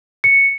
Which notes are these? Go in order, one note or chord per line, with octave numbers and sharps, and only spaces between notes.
C#7